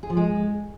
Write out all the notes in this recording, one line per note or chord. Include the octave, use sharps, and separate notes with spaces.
G#4
F3
G#3